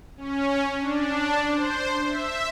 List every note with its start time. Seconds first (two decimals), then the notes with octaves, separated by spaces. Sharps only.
0.17 C#4
0.79 D4
1.49 C5
2.07 E5